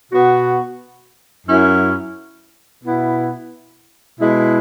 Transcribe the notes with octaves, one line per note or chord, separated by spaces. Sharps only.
B2 B3 F#4
F#2 F#3 C#4 E4
B2 B3 E4
B2 G#3 E4